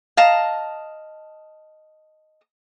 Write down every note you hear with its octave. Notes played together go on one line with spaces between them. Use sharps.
D#5 F5 A5 A#5